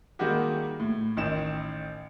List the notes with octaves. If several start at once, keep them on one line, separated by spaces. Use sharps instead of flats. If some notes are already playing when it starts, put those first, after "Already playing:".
D#3 G3 G#3 A#3 F#4 G4
A2
A1 D#3 E7